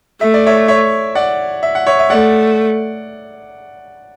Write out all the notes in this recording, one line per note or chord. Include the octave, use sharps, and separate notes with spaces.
A3 E5
D5
C#5 E5
C#5 E5
D5 F#5
E5
F#5
C#5 E5
E5
A3 D5 F#5